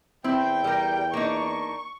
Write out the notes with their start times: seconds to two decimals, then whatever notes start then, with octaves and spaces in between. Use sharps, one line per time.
0.24 E2 C4 E4 G5
0.64 G3 A#4
1.13 A#3 D4 D#4 C#6